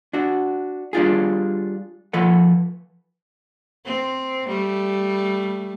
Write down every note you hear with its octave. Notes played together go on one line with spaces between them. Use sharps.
D4 F#4
G3 D4 F4 G#4
F3 A4 B4 F#5
C4
G3 A3